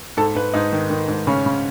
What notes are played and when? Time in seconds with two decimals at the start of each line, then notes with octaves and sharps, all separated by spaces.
0.17 G#2 A4
0.35 G#2 B4
0.53 G#2 D#4
0.72 D#3
0.90 D#3
1.08 G#2
1.27 C#3 C#4
1.46 C#3